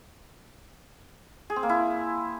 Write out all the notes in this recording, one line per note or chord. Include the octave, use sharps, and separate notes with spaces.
G#4
C4
A#3
E4